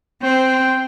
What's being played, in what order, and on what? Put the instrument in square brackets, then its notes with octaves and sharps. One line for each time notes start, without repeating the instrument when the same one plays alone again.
[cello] C4 [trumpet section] C5 [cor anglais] G5